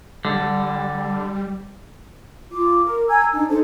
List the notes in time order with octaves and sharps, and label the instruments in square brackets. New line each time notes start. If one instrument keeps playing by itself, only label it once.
[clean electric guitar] D3 [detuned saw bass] G3
[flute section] F4 D6
A#4
G#5 A#5 E6 G#6
D4 D#4
D#4 A4 C5